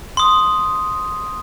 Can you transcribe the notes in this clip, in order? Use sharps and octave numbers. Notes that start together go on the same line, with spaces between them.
C6 D#6